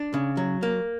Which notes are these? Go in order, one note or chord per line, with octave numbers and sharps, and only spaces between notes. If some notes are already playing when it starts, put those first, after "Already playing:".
Already playing: D4
C#3
F#3
A#3